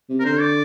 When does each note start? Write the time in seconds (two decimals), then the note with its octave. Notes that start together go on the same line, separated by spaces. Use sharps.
0.10 C3
0.20 A#4
0.24 D3 C5
0.40 D5